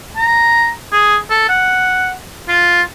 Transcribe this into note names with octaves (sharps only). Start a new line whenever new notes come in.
A#5
G#4
A4
F#5
F4